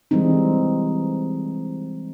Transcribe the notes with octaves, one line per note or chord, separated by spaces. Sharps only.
E3 G3 G#3 C4 D#4